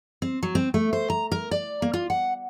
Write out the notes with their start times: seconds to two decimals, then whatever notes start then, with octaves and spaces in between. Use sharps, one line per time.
0.22 C4
0.43 F#3
0.55 C4
0.74 A3
0.93 C5
1.10 A#5
1.32 A#4
1.51 D5
1.82 A#3
1.94 F4
2.10 F#5